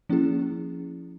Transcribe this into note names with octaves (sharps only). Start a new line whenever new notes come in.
F3 A#3 C#4 E4 G#4